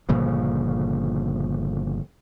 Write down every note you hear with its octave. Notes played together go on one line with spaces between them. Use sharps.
G1 A#2 C#3 F3